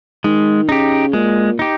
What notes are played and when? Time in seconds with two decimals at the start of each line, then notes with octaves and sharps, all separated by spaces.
0.24 D#3 G#3
0.69 C#3 D#4 G4
1.13 A#2 G#3
1.59 D#4 G4